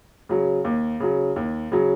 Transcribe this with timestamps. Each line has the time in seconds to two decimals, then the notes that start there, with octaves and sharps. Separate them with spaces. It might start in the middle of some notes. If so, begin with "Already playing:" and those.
0.29 C#3 F#3
0.64 D#2
1.00 C#3 F#3
1.36 D#2
1.72 C#3 F#3